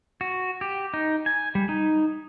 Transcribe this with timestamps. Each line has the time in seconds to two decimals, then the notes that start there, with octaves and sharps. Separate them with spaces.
0.21 F#4
0.61 G4
0.94 D#4
1.26 G#5
1.55 G3
1.69 D#4